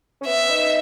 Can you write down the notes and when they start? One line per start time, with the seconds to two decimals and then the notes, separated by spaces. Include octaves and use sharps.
0.21 C#4
0.26 B3 E5
0.50 D#4